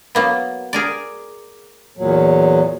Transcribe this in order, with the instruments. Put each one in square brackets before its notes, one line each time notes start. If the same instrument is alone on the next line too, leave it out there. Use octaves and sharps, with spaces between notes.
[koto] F#3 A#3 B3
G#4 A#4 D5
[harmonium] E2 A#2 F#3